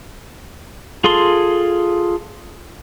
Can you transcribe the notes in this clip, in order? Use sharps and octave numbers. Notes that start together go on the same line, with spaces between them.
F4 G#4 A4 C6